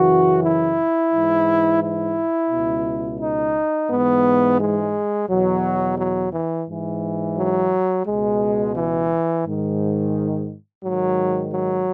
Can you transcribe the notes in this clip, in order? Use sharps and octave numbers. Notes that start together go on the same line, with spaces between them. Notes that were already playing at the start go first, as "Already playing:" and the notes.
Already playing: F#2 C#3 E3 F#4
E4
G#2 E3
E4
C#2 B2
D#4
G#2 E3 B3
G#3
E2 B2 F#3
F#3
E3
G#2 E3
F#3
C#2 B2 G#3
E3
G#2 D#3
G#2 D#3 F#3
F#3